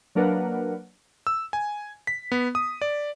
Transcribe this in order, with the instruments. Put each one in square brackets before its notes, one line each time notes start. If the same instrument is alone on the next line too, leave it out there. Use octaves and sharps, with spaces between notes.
[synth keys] F#3 A#3 D4 A#4 B4 F#5
[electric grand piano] E6
G#5
B6
B3
D#6
D5